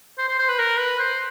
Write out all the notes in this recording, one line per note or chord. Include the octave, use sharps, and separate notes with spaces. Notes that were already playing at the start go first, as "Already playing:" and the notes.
C5
C5
C5
B4
A#4
B4
C5